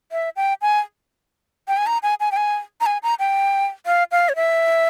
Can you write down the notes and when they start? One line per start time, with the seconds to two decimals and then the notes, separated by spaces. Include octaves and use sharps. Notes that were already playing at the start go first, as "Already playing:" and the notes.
0.12 E5
0.36 G5
0.62 G#5
1.68 G5
1.77 G#5
1.87 A#5
2.03 G#5
2.20 G#5
2.32 G5
2.37 G#5
2.81 A#5
2.86 G#5
3.03 A#5
3.19 G5
3.86 F5
4.11 F5
4.29 C#5
4.36 E5